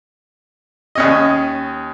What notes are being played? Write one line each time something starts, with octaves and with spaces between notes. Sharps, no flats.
D#2 C#4 D#5